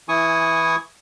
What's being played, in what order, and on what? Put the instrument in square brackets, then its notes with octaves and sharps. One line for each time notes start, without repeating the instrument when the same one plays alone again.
[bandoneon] E3 E4 G#5 C#6 D#6